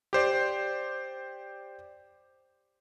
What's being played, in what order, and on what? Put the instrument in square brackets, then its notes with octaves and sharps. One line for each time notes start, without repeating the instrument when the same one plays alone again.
[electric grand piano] G4 C5 D5